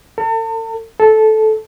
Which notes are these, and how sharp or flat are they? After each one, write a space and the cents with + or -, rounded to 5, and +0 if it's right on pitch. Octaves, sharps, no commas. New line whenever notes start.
A4 +40
A4 -15